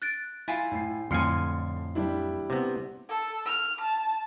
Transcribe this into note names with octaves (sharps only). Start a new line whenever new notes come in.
F#6 A6 D7
E4 F4 G#5 A6
A2 C7
F2 A2 D3 G#5 C6 F6 C7 C#7
G3 D4 E4
C3 B3
A4
F6
A5